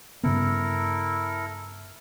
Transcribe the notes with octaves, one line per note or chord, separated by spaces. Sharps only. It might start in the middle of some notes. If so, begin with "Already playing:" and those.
G2 C#3 B3 E4 A4 A#4